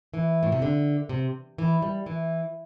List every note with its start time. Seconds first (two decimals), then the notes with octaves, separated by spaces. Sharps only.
0.14 E3
0.43 A2
0.52 C3
0.62 D3
1.09 C3
1.58 E3
1.82 G3
2.06 E3